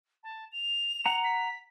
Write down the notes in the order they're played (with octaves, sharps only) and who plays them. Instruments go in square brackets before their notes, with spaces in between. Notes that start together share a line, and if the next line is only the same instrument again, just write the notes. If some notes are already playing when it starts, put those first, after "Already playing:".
[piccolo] A5
F7
[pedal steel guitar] F#5 A#5
[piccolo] B6